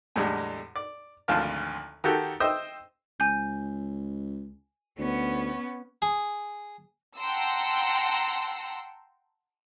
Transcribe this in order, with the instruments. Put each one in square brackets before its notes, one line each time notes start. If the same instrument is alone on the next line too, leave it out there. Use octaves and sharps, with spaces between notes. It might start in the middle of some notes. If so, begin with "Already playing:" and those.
[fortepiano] E2 A2 D3 G3 G#3
D5
G#1 D2 F3 F5 A5
D#3 F#4 G4 A4
C5 D#5 E5 G5
[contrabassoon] C#2 [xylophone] G#5 G6
[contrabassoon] D2 [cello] B3 C#4
[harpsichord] G#4
[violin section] F#5 G5 A5 A#5 C6 E6